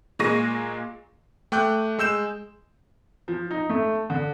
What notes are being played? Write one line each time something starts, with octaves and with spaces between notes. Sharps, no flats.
A#2 G#3 A#3 C#6 A#6 D#7
A3 G5 D6 F#6 G6
G#3 E6 G6 E7
F3
D#4
A3
D3